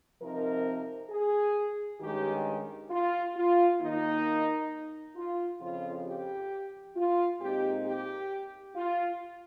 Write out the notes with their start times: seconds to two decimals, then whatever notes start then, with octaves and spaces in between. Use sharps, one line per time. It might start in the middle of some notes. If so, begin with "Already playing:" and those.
0.20 C3 F3 C4 D#4 A#4
1.10 G#4
2.00 G2 D#3 G#3 C#4 G4
2.90 F4
3.35 F4
3.80 D#2 D#3 A#3 D#4
5.15 F4
5.59 F2 C#3 F3 F4
6.05 G4
6.95 F4
7.40 A#2 G#3 C4 D#4 G4
7.85 G4
8.75 F4